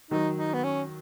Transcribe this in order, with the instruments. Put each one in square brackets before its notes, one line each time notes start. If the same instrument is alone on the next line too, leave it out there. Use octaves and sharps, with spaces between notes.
[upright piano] D#3 F#3 [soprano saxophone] D#4
[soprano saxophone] D#4
B3
C#4